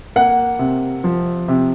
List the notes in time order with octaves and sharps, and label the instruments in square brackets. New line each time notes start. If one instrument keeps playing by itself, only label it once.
[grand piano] A#3 F#5
C3
F3
C3